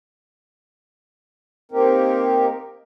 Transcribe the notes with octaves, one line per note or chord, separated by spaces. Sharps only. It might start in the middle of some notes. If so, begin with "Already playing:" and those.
A#3 C4 D#4 G4 A#4